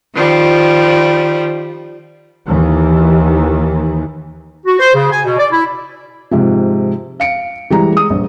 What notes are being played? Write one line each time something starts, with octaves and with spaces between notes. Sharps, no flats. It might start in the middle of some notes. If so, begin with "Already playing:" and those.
D#3 F3 G3
D#2 D#3 E3
F#4
C5
C#3
G#5
B2
D5
E4
G#2 C3 F3
F5 C#7 D7
E3 G3 G#3 A#5
G#3 D#6
A#1 G2